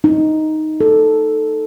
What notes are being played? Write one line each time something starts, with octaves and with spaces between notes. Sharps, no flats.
D#4
A4